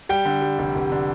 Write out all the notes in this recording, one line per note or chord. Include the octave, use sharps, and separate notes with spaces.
G3 G5
D3
G3
F1
F1
D3